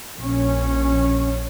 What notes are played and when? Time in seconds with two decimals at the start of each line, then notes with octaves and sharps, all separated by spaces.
0.15 A#1 C#4